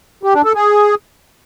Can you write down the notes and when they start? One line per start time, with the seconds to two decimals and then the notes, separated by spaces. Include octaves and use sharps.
0.23 G4
0.34 D4
0.45 A4
0.55 G#4